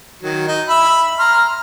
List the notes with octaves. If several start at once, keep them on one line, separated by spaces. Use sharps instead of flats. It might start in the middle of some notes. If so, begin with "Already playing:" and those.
D#3 F#3
D#4
E5 B5 E6
A#5 C6 F6